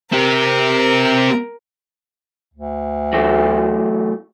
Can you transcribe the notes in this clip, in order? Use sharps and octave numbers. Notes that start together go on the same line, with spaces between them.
C4 G4 A#4
D2
E3 F#3 A3